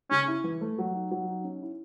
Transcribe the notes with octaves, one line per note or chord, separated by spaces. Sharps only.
C#3 C#4
E4
E3
A3
F#3
D#4
F#3
D#4
C#4
E4